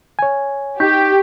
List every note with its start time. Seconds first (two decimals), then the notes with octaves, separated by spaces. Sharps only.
0.19 C#5 G#5
0.80 D#4 G4 C#6 G6 B6